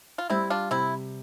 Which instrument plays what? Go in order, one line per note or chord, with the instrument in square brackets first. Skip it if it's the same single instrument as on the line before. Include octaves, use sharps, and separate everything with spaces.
[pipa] F4
[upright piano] G3 [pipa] C4 E4
[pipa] D4 F4
[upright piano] C3 [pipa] C4 E4